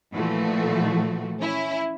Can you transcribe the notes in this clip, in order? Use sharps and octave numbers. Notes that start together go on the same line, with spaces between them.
A#2 E3 F3 A3 F#4
C#4 E4